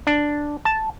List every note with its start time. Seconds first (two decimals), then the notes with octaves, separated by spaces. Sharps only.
0.07 D4
0.65 A5